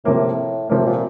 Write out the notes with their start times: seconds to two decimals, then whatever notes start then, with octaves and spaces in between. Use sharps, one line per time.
0.05 A2 C3 F3 A#3
0.69 A2 C3 F3 A#3
0.86 A#2